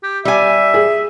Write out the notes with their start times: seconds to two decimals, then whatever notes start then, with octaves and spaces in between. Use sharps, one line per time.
0.03 G4
0.25 G3 E5 G#5
0.74 G#4